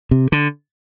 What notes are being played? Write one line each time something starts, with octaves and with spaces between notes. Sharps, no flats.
C3
D3